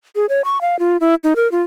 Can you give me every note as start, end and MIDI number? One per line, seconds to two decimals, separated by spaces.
0.16 0.26 68
0.29 0.42 73
0.45 0.61 85
0.61 0.79 77
0.79 0.97 65
1.00 1.15 64
1.24 1.34 63
1.36 1.50 70
1.52 1.62 65